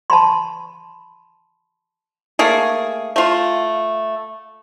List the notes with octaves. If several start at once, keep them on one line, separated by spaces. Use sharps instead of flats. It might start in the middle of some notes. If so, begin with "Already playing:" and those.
A5 B5 C6
A3 A#3 G#4
A3 F4